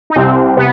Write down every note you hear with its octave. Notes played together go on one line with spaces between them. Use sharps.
D#4
C2 C4
C3 B3